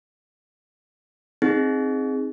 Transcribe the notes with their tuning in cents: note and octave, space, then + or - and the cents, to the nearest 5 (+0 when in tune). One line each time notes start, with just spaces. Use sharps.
C4 +10 D#4 +0 G#4 +0